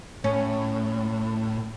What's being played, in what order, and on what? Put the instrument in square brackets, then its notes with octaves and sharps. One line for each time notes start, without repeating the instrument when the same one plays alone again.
[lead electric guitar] A2 [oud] C#4